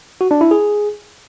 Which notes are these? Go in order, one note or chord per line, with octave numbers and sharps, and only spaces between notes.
F#4
D4
E4
G#4